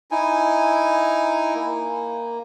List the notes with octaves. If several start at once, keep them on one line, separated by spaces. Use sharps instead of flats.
D#4 E4 G#5
A#3